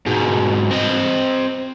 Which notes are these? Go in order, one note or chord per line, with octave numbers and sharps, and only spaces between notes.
G#2 B2
C4 D#5